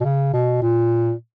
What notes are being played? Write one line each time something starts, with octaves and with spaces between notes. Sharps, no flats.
B2
C#3
B2
A#2